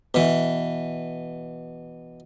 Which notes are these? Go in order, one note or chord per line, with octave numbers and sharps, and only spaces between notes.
B2 E3